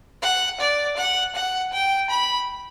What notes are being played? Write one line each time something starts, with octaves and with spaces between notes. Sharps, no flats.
F#5
D5
F#5
F#5
G5
B5